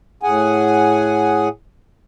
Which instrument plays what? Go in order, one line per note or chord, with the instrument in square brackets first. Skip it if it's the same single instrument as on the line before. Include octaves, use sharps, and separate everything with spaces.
[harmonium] A2 G#4 F#5 G#5